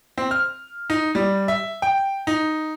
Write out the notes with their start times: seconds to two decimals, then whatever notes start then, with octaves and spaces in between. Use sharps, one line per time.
0.18 C4
0.31 F6
0.90 D#4
1.15 G3
1.48 E5
1.82 G5
2.27 D#4